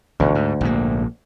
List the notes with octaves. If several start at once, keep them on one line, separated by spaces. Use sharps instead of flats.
A1 D2 B2
G#2
A#1 G#2 A#3